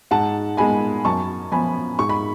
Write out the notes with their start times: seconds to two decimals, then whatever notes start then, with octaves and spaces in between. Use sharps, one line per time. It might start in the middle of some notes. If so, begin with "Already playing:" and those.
0.11 G#2 F#5 A5
0.57 G#3 B3 G#5 B5
1.05 F#2 A5 C#6
1.52 F3 B3 G#5 B5
1.99 G#2 C#6
2.09 B5